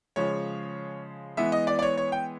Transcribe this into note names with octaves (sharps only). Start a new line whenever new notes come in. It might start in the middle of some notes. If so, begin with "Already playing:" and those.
C#3 F3 G#3 C#5
E3 G#3 B3 E5
D#5
D5
D5
C#5
C#5
G5